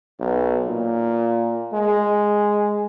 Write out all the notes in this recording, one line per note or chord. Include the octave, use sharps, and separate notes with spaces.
B1
A#2
G#3